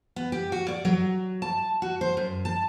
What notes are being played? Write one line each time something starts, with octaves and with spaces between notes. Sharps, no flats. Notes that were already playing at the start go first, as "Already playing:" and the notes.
B3
G4
F#4
D5
F#3
A5
F#4
C5
F#2
A5